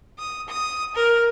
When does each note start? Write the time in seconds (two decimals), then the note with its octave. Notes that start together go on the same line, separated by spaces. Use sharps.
0.19 D#6
0.49 D#6
0.96 A#4